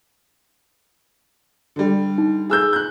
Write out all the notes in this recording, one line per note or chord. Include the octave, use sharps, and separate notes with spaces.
D3 G3
D#4
G#4 E6 G6
F#6 G6